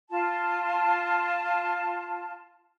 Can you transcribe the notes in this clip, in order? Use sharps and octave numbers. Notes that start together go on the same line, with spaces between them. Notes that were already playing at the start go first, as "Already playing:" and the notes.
F4 A5